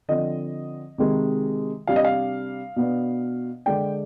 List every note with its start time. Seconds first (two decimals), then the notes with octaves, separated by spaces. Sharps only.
0.08 D3 F3 C4 D#5
0.98 C3 D#3 G#3
1.87 C3 G3 D4 F5
1.96 D#5
2.04 F5
2.76 B2 B3 D4
3.66 D3 G#3 D4 G5